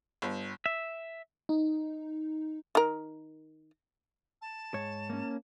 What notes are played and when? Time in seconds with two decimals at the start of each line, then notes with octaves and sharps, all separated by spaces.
0.22 G1
0.66 E5
1.49 D#4
2.75 D#3 A#4
4.42 A5
4.74 G#2 C#5
5.10 A#3 C#4